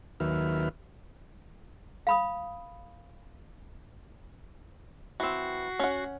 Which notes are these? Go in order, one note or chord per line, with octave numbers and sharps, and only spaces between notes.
D#2 D#3 F#3 B4 E5 F6
F5 B5 D#6
E3 C4 F#4 C7
C#4 F#5